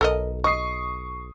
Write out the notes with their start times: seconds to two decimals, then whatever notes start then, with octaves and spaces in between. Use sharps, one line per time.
0.01 B1 A4 A#4 D#5
0.44 D#5 C#6 D#6 C7